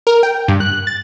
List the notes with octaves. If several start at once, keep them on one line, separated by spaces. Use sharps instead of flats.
A#4
G5
G2
F#6
A6